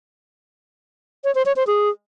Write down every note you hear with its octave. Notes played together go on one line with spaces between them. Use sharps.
C#5
C5
C#5
C5
G#4